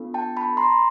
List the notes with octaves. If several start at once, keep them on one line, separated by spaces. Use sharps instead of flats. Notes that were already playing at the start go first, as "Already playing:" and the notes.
Already playing: B3 D4 F4 A4
G5 A5
A5 B5
A#5 C6